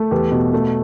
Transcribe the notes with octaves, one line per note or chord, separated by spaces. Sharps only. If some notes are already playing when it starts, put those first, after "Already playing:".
Already playing: A3
E2 G4 B4
B2
A3